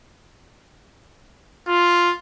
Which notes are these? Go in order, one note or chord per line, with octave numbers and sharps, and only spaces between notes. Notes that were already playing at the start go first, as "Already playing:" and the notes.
F4